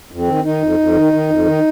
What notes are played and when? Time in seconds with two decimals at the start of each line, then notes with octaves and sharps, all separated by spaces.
0.11 F2
0.19 C4
0.28 D#3
0.44 D#3 D#4
0.61 F2
0.79 F2
0.96 D#3
1.13 D#3
1.29 F2
1.47 D#3